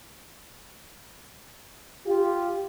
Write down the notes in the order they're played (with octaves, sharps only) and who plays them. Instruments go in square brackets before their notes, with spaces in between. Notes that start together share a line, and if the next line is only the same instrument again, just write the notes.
[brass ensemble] F4 G4